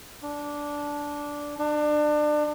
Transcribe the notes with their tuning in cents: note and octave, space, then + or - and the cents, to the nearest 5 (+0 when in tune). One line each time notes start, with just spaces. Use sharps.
D4 -10
D4 +30